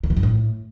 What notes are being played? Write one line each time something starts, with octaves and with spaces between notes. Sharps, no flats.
D3
E3
G2
A2